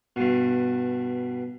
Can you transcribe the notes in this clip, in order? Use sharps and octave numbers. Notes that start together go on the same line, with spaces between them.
G2 B2